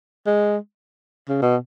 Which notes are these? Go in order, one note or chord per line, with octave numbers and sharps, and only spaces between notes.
G#3
C#3
B2